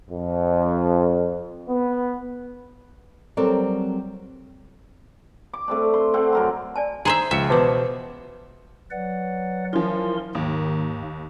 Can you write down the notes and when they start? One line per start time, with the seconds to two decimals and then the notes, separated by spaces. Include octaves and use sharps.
0.10 F2
1.69 B3
3.37 F#3 G3 C4 A4 A#4 D5
5.53 D6
5.68 A3 C4 D4
5.94 C6
6.14 C4 A4 F#5
6.33 F#2 A#4 C6
6.76 D5 G#5 A5
7.05 D#4 G#4 C5 E5 A#5
7.31 C#2 F3 E5 C#7
7.49 B2 E3 B4 C5 A5 D6
8.91 F#3 B4 D5 F#5
9.73 E3 F3 A#4 C6
10.35 D#2 G#2 D#3 A#3